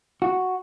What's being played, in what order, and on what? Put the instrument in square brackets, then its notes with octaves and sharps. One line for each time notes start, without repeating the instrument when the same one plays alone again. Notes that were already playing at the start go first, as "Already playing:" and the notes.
[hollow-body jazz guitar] F#4